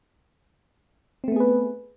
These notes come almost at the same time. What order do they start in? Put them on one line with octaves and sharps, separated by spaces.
C4 A3 B3 G#4 B4